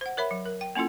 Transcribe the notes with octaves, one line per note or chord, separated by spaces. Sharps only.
C5 F#5
A#4 C#5 E5 B5
F#3
A#4
G5
A#3 C#4 E4 F4 A4